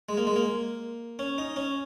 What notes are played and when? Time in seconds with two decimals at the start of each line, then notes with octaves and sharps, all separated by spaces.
0.09 G#3
0.17 A#3
0.27 G#3
0.36 A#3
1.19 C#4
1.38 D#4
1.56 C#4